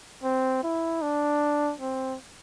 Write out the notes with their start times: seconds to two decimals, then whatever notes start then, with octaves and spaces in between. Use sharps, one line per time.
0.23 C4
0.63 E4
1.02 D4
1.81 C4